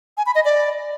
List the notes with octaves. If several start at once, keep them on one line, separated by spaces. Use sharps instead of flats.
G#5
B5
D#5
D5